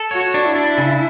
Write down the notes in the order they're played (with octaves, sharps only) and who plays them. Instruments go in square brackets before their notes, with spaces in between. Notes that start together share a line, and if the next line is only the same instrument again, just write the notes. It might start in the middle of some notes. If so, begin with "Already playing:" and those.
Already playing: [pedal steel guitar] A4
[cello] F#4 [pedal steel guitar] C#5
[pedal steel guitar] D4
[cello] E4
[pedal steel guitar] D4
C#3